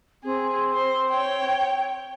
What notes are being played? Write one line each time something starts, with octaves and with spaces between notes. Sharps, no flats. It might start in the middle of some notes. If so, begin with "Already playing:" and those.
C4 G#4
C5
C#5 G5